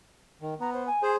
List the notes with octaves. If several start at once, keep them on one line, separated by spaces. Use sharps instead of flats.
D#3
B3 A#5
C5
G#5
G#4 C5